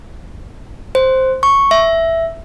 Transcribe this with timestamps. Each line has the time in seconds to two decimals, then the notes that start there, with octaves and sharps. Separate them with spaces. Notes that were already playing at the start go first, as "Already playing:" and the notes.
0.95 C5
1.43 C#6
1.71 E5